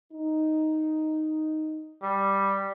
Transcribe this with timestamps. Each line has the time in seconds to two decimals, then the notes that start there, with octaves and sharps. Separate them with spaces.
0.13 D#4
2.02 G3